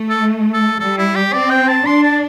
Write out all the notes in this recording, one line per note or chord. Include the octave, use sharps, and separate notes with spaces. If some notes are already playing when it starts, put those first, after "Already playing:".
Already playing: A3
A4
A4
G3 A4
E4
G4
C4 D5
G5
A5
D4 C6
A5